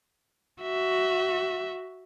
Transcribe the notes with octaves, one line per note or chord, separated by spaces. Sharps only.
F#4 E5